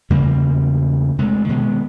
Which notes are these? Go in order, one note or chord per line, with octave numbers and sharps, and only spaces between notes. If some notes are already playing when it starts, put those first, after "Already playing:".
E2 C#3 G3 A#3
C3 G#3 A3
B2 D#3 G#3 B3